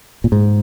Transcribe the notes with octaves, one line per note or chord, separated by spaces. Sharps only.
A#2
G#2